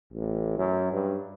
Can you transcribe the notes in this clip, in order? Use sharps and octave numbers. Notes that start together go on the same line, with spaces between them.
A1
F#2
G2